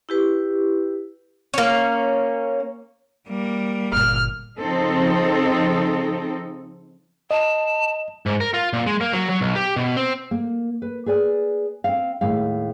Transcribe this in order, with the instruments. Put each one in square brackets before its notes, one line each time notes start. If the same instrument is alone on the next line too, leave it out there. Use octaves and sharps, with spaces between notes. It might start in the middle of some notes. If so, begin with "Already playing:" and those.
[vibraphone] E4 G4 B4
[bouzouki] A#3 C#4
[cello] G3 A#3
[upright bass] G1 A#2 [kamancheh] F6
[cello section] C#3 F3 C4 D#4 A4
[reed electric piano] D#5 [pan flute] A5
[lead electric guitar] G#2
A#4
F4
A#2
G#3
A#3
F#3
F#3
B1
G4
B2
C4
[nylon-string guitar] A#3
B4
G#4 B4 D5 G#5
C4 F5
D#2 A2 G#3 F5